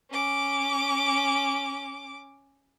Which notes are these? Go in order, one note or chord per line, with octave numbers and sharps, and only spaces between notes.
C#4 D6